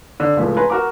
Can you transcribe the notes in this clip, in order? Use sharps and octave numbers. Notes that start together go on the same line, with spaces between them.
D3
C#2 A2 F3 A3
B4 G#5 A#5 C6
F#4 A#4 F#5 D6